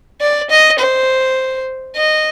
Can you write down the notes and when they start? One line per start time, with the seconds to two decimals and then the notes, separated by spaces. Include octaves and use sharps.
0.21 D5
0.50 D#5
0.79 C5
1.96 D#5